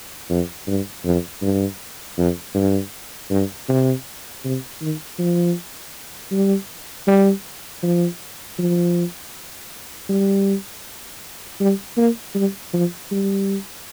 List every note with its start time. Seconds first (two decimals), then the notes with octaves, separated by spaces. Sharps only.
0.30 F2
0.67 G2
1.05 F2
1.42 G2
2.18 F2
2.55 G2
3.31 G2
3.69 C3
4.44 C3
4.81 D#3
5.19 F3
6.32 G3
7.07 G3
7.83 F3
8.59 F3
10.09 G3
11.60 G3
11.97 A#3
12.35 G3
12.73 F3
13.11 G3